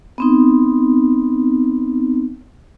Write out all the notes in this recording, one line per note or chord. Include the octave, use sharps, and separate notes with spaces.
B3 C4 D#4